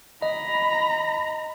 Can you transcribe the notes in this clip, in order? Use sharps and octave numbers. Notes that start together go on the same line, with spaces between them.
D#5 A#5 B5